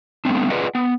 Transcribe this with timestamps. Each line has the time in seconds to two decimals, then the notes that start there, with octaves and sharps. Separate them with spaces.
0.25 G3 A3 B3 C4 D4
0.50 F4 G#4 B4 D5 D#5 F#5
0.75 B3